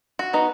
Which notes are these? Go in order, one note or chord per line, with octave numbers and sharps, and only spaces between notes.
F#4
B3 D#4